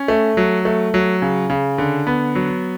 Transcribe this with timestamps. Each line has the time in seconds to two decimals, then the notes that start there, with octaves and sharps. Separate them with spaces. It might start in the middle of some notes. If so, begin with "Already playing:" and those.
Already playing: C#4
0.08 A3
0.37 F#3
0.65 A3
0.94 F#3
1.22 C#3
1.50 C#3
1.78 D3
2.07 B3
2.35 F#3